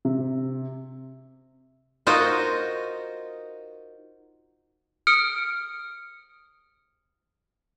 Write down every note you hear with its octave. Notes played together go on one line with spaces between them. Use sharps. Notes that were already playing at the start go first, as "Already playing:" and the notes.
C3
D#4 F4 F#4 A#4 C5 D#5
D#6 F6 C#7 D7